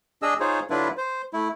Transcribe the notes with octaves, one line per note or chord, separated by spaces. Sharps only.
D4 G#4 D#5 E6
D#4 F4 G#4 C5 C#5
D3 F#3 D4 E4 F4 B4
C5
A3 E4